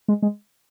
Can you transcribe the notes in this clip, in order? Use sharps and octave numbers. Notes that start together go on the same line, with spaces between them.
G#3
G#3